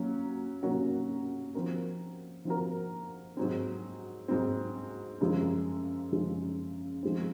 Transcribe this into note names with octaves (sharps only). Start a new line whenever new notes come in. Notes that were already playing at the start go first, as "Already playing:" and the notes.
Already playing: F#3 A#3 C#4
F#3 A#3 C#4 F#4 A#4
F3 C4 F#4 A#4
F3 C4 F#4 A#4
G#2 F#3 C4
G#2 F#3 C4
F#2 C#3 F3 G#3
F#2 C#3 F3 G#3
F3 G#3 C4